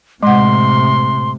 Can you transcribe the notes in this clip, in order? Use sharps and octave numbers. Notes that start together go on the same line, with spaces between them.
A2 C3 G#3 F#5 C6